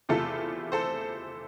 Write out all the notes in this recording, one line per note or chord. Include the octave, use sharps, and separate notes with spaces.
E2 C3 E3 A3 F4 A4
A4 C5